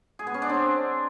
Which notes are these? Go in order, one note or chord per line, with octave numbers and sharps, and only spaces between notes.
G#4
B3
C#4
D4
C4